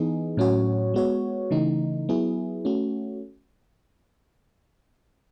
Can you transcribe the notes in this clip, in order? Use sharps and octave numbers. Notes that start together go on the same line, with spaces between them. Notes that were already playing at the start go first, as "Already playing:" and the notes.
Already playing: E3 B3 D#4 G#4
A2 F#3 C#4 F#4 C#5
G#3 B3 F#4 C#5
C#3 E3 A3 D#4
F#3 B3 E4 G#4
A3 C#4 F#4